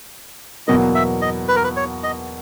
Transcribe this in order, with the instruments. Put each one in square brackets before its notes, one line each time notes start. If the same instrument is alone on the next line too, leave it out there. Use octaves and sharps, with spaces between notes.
[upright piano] E2 B2 F#3 A#3 [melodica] D#5
[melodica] E5
D#5
B4
A#4
B4
C#5
D#5